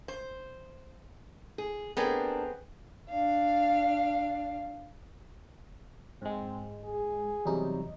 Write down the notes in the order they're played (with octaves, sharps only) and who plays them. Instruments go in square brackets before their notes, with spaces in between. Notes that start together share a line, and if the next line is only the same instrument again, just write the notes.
[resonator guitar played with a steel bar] C5
[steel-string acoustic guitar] G#4
[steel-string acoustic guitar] A3 D4 A#4 [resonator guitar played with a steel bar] B3 C4 G#4
[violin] D4 F5
[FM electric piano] G#2 G#3 [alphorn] C4
[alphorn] G#4
[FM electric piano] E2 D#4 [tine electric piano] C3 F#3 G3